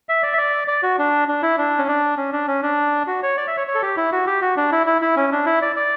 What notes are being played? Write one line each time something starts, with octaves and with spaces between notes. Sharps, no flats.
E5
D5
E5
D5
D5
F#4
D4
D4
E4
D4
C#4
D4
C#4
D4
C#4
D4
F#4
C#5
D5
E5
C#5
C#5
A4
G4
E4
F#4
G4
F#4
D4
E4
E4
E4
C#4
D4
E4
D5
D5